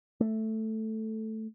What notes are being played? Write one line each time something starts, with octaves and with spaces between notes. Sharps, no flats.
A3